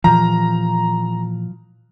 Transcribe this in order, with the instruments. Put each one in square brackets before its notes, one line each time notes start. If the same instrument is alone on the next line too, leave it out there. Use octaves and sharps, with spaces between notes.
[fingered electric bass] A#2 E3 [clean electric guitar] F3 [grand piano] A#5